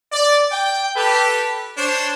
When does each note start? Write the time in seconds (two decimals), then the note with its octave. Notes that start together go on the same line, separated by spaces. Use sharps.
0.12 D5
0.52 G5
0.95 G4 A4 B4
1.77 D4 C5 C#5